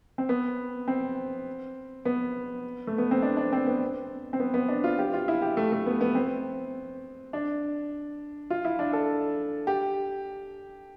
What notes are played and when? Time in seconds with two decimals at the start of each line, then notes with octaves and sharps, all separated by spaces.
0.18 C4
0.29 B3
0.88 C4
2.05 B3
2.87 A3
2.98 B3
3.11 C4
3.22 D4
3.37 D4
3.52 C4
3.67 B3
4.33 C4
4.40 B3
4.54 B3
4.68 D4
4.84 F4
4.99 G4
5.14 F4
5.28 E4
5.42 G4
5.57 A3
5.72 A3
5.86 B3
6.01 B3
6.15 C4
7.33 D4
8.50 F4
8.65 E4
8.79 D4
8.93 A4
9.67 G4